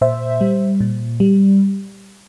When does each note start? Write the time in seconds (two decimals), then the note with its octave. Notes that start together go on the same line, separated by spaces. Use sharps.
0.01 A#2 C5 E5
0.41 G3
0.81 A#2
1.20 G3